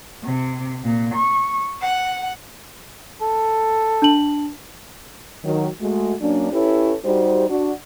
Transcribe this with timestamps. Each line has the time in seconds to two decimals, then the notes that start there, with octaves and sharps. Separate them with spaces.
0.24 C3
0.83 A#2
1.15 C#6
1.82 F#5
3.22 A4
4.02 D4 A5 F#7
5.45 D#3 F#3
5.81 G#3 A3 F#4
6.21 F#3 A#3 C#4 D4
6.52 C#4 E4 G4 A4 B4 C#5
7.05 G3 D#4 F#4 G4 C5
7.49 D4 F#4